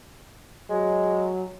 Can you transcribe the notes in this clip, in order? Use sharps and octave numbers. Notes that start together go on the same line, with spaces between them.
F#3 G#3